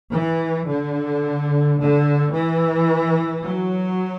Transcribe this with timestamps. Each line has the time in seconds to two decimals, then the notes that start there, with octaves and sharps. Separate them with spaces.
0.14 E3
0.69 D3
1.80 D3
2.35 E3
3.45 F#3